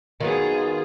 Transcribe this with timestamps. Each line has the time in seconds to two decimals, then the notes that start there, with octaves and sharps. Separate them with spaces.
0.20 D#3 F#3 B3 F4 G#4